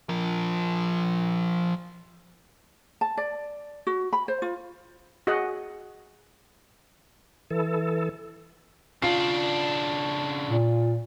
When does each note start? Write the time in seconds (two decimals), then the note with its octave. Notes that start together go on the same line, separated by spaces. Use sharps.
0.09 F3 A#4
3.01 A5
3.17 D5
3.87 F#4
4.13 B5
4.28 C5
4.42 F4
5.27 F#4 G#4 D#5 F#5
7.51 E3 A4
9.02 C#3 D4 F4 C7
10.48 A#2